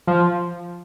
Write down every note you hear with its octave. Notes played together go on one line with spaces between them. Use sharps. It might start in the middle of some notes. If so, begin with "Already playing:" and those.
F3